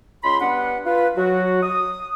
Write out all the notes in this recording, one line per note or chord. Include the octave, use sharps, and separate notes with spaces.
C#2 B5 C6
G3 B3 D4 B4 F#5
F4 B4
F#3 F#4
D#6